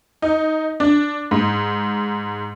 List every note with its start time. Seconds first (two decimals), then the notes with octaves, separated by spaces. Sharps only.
0.22 D#4
0.80 D4
1.31 G#2